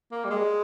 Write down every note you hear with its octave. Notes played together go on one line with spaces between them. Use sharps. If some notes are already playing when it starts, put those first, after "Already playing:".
A#3
G3
G#3